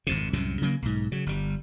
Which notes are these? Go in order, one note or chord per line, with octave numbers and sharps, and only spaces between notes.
G#1 F2 C3
C2 F#2 A2 C3
C#3 F#3 G3 A#3
B1 G#2
C#3 F#3
G1 G3